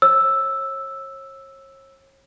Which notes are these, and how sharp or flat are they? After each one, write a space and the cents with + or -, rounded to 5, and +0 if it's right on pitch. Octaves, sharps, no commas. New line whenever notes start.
C#5 -40 E6 +0